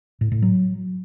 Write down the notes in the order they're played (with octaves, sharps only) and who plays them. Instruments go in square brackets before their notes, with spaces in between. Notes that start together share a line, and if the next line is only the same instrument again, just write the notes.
[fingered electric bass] A2
A2
F#3